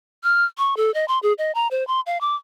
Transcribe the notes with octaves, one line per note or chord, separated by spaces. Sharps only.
F6
C#6
A4
D#5
C6
G#4
D#5
A#5
C5
C6
F5
D6